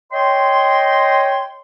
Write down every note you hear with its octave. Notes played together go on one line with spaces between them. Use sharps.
C#5 D#5 G5 C6